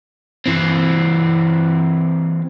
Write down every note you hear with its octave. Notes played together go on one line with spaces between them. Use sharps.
E3 C4